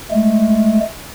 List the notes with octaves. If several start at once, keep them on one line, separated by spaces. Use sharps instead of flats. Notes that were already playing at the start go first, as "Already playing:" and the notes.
G#3 A3